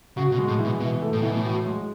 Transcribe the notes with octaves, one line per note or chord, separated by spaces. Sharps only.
C#3 F#4
B2
G#3
A2
E3
B2
B2 E3
A3
A2
B2 E3
A2
F#4
G#3